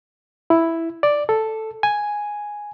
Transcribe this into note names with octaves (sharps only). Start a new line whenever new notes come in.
E4
D5
A4
G#5